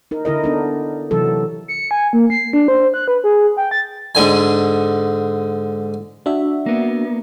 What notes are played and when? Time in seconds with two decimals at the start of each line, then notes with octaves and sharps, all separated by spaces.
0.11 D#4 A#4
0.25 D3 E4 A#4 D#5
0.44 B3 D4 D#4
1.11 C3 E3 F#3 A4
1.68 C#7
1.91 G#5
2.13 A#3
2.30 C7
2.53 D4
2.68 C5
2.94 F#6
3.08 B4
3.24 G#4
3.57 G5
3.71 A6
4.15 G#2 D3 G#5
6.26 D4 F#4 E5
6.66 A#3 B3